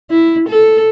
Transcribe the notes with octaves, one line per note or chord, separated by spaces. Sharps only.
E4
A4